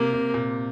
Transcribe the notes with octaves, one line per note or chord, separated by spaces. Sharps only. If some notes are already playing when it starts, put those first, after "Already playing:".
Already playing: C3 A#3
C3
A#2